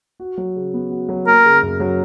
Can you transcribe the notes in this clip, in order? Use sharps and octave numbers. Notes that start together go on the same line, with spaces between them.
F#4
F#3
C#3
B3
F#4
F#3
A#3 A#4
C#3
F#2
F#3